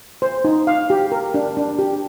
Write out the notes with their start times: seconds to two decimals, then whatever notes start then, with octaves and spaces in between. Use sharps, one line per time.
0.22 C5
0.44 D#4
0.67 F5
0.90 G4
1.12 A#4
1.34 D4
1.57 D4
1.79 G4